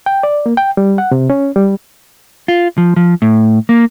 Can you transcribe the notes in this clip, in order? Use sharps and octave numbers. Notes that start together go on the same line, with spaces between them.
G5
D5
A#3
G5
G3
F#5
C3
C#4
G3
F4
F3
F3
A2
A#3